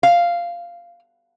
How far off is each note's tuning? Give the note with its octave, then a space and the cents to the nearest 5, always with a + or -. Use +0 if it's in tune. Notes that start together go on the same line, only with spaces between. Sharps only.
F5 -10